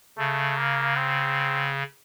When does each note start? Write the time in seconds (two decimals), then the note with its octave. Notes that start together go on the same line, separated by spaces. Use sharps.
0.18 C#3 A3
0.57 A#3
0.97 C4